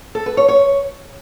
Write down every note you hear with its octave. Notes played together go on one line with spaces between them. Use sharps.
A4
B4
C#5
C#5